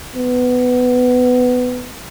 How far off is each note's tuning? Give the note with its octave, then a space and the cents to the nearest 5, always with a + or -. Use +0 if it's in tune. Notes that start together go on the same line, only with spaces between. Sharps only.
B3 +15